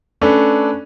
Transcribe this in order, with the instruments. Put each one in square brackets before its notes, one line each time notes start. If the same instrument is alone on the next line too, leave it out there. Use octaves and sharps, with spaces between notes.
[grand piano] A3 C#4 D4 A4 B4